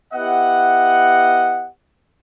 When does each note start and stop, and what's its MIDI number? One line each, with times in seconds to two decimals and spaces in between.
0.14 1.68 59
0.14 1.68 64
0.14 1.68 67
0.14 1.68 75
0.14 1.68 78